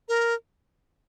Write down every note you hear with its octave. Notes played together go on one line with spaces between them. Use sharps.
A#4